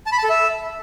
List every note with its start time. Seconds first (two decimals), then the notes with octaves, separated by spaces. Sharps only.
0.06 A5
0.12 B5
0.18 A5
0.24 A4
0.30 E5